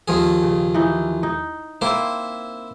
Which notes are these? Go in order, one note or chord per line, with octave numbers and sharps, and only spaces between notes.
D#2 F3 G#4
C#3
E3 D#4
D#4
A#3 C4 E4 C5